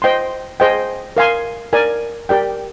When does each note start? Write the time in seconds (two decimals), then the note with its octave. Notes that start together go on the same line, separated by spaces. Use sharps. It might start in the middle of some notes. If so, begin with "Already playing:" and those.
0.02 C5 D#5 G5 C6
0.60 G#4 C5 D#5 G5
1.17 A#4 F5 G#5 C6
1.73 A#4 D5 G#5
2.29 G4 A#4 D5 G5